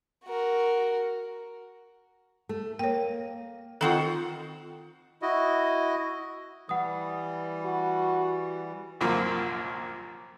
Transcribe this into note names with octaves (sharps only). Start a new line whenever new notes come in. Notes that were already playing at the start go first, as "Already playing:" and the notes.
F#4 A#4
A3
A#3 C#5 G5
D#3 C4 F4 A4 F#5
E4 F#4 D#5
E3 G3 F#5 D#6
F#4
C2 F#2 A#2 D3 F3 A#3